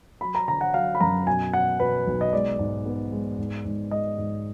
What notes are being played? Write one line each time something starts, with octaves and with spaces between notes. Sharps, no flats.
F#3 B5
A#5
D3 A#5
F#5
F#3 F5
B5
F#2 A#5
B2 G#5
B2 F#5
B2 B4
B1
D#5
G#3 D5
G#2
B3
G#3
G#2
G#2
G#3 D#5
G#2